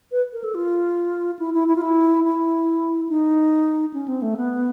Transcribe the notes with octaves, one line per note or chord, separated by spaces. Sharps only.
B4
A#4
A4
F4
E4
E4
E4
F4
E4
E4
D#4
C#4
C4
A3
B3